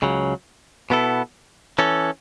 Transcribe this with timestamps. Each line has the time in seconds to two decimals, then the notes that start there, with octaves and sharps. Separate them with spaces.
0.02 C#2 C#3 F#3
0.90 B2 B3 E4 A4
1.79 E3 C#4 A4